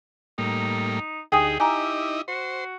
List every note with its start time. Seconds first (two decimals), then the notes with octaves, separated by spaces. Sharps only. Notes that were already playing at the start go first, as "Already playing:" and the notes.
0.38 A2 G3 A#3 D#4
1.32 D2 D#4 G4 G#4 G5 G#5 D#6
1.60 D#4 E4 G4 D#5 G#5 A#5
2.28 F#4 C5